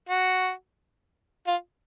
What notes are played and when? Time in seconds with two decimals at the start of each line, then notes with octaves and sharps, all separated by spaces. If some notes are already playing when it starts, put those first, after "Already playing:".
0.09 F#4
1.47 F4